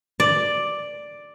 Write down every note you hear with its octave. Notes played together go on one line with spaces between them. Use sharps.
D5